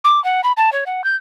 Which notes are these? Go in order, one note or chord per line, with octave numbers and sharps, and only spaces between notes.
D6
F#5
B5
A5
C#5
F#5
G6